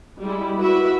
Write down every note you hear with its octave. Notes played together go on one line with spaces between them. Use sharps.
G3 G#3 E4
E4 F#4 B4 E5